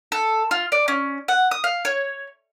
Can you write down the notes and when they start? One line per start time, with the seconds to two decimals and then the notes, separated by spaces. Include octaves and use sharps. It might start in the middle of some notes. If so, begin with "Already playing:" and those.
0.12 A4
0.51 F4
0.72 D5
0.88 C#4
1.28 F#5
1.51 D#6
1.64 F5
1.85 C#5